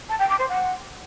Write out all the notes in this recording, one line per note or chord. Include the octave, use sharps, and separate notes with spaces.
A5
G5
D6
C5
F#5